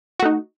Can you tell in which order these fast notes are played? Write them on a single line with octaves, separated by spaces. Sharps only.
F#4 A3 D#4